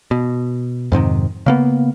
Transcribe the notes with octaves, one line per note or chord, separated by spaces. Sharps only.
B2
F2 G#2 C3 D#3
C#3 A#3 B3